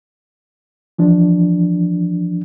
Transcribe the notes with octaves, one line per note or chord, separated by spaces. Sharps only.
E3 F3 D4